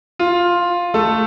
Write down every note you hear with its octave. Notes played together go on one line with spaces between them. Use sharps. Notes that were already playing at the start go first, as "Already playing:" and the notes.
F4
A3 A4